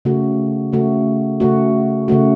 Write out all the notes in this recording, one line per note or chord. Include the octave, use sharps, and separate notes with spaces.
C#3 A3 F#4
C#3 A3 F#4
C#3 A3 F#4
C#3 A3 F#4